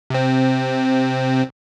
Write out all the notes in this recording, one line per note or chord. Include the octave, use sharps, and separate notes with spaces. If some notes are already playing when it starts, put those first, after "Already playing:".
C3 C4